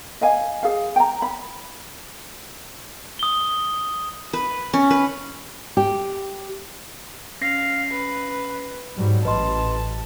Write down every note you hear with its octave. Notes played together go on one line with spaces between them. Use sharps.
D#5 F5 G#5
G#4 F5
G5 A#5
B5
D#6 G7
B4
C#4
B4
G4
C#4 F5 A#6 C7
B4
G#2 F#3 G3
A1 B4 D#5 A5 C6